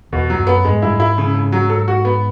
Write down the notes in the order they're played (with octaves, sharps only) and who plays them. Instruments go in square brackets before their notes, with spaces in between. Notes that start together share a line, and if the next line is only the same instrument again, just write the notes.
[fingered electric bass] E2 [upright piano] B2
[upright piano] F#3
[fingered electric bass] F#2
[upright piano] B3
[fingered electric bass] G#2 [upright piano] G#3
[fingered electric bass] F#2 [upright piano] E4
[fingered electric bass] G#2
[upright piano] E4
C#3
C#3
F#3
A4
F#4
B3